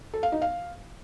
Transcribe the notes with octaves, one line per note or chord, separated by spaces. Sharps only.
A4
F5
D#4
F5